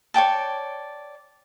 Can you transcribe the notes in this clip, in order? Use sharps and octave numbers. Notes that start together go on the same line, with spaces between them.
C#5 D5 G5 A5